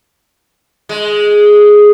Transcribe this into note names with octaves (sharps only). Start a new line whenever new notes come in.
G#3